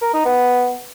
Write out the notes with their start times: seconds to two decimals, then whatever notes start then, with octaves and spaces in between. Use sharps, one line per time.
0.01 A#4
0.13 D#4
0.25 B3